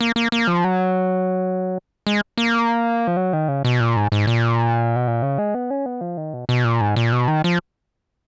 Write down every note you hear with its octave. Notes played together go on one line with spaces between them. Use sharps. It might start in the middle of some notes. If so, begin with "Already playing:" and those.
A#3
A#3
A#3
F3
F#3
G#3
A#3
F3
F#3
D#3
C#3
B2
A#2
G#2
G#2
A#2
B2
A#2
C#3
G#3
B3
C#4
B3
F3
D#3
B2
B2
A#2
G#2
A#2
B2
D#3
F3